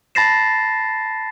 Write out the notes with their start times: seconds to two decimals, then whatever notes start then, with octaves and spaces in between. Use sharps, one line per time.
0.15 A5 B5 A6 A#6 C7 E7